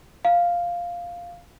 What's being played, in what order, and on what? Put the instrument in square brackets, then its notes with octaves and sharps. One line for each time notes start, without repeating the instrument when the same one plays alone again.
[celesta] F5